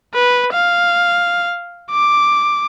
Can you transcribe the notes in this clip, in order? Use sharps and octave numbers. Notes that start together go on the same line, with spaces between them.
B4
F5
D6